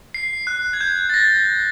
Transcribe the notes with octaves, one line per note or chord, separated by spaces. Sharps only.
C7
F#6
G#6
G6
A6
A#6